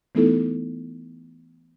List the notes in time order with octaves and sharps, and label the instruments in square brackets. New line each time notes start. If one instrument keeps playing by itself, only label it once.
[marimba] E3 A3 B3 D#4 E4 A4